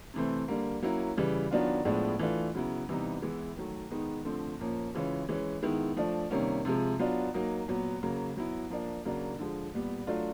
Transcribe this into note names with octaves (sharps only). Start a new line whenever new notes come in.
C3 E3 A3 C4
D3 G3 A#3
F#3 A#3 C#4 E4
C#3 E3 G3
D#3 F#3 B3 D4 F4
A2 F3 G#3 B3 D4
E3 A3 D4 F4
C#3 F#3 B3 E4
C3 E3 G3 B3 D#4
E3 G#3 B3 E4
D#3 F#3 A3
D#3 G#3 B3 D#4
D3 F3 A3 C4
A#2 F3 A#3 C#4
C#3 E3 G#3 C#4 F4
E3 G#3 C#4
D#3 G#3 B3 E4
F3 A3 D4
C3 D#3 G3 A#3 C#4
C3 F3 G#3
F#3 B3 D4 F4
F#3 A#3 D#4
A#2 F#3 B3
C#3 F#3 A#3
F#3 B3 E4
F3 A#3 D4
C#3 F#3 A#3 D4
D3 F3 G#3
A#2 G3 B3
F#3 A3 D4 F4